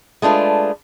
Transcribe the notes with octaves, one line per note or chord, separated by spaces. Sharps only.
G#3 A3 D4 F4 B4